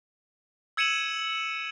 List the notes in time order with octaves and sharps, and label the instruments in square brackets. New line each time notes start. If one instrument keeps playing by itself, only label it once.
[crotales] E6 G#6 C#7 D#7 E7 F#7